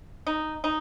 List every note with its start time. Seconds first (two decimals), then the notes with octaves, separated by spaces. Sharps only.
0.27 D#4
0.64 D#4